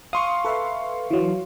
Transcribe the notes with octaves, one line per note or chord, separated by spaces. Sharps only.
F5 C6 C#6 D#6
A4 B4 E5
E3 F#3